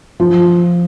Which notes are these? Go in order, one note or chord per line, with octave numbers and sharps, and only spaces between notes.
F3